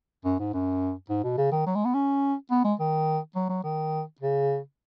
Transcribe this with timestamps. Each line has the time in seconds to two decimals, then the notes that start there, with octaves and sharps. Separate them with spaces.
0.25 F#2
0.39 G#2
0.53 F#2
1.09 G#2
1.24 B2
1.38 C#3
1.52 D#3
1.66 F#3
1.75 G#3
1.85 B3
1.94 C#4
2.50 B3
2.64 G#3
2.79 D#3
3.35 F#3
3.49 F#3
3.63 D#3
4.20 C#3